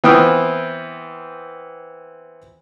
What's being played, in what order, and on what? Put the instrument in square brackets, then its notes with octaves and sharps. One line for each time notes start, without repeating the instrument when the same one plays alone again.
[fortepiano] E3 B3 C4 G5 D#6 F6